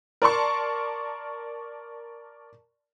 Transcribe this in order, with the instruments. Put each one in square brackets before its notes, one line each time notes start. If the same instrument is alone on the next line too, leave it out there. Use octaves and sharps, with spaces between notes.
[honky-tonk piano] A#4 D5 A5 C6 C#6